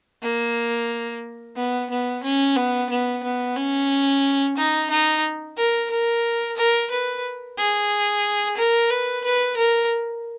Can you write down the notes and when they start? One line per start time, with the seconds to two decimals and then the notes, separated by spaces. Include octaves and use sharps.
0.22 A#3
1.56 B3
1.90 B3
2.23 C#4
2.56 B3
2.90 B3
3.23 B3
3.56 C#4
4.57 D#4
4.90 D#4
5.57 A#4
5.90 A#4
6.57 A#4
6.91 B4
7.57 G#4
8.57 A#4
8.90 B4
9.24 B4
9.57 A#4